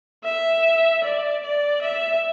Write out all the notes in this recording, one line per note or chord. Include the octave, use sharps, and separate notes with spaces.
E5
D5
D5
E5